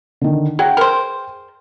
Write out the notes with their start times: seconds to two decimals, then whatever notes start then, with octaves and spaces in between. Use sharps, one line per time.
0.21 D3 D#3
0.59 F#3 G#4 G5
0.77 A#4 C5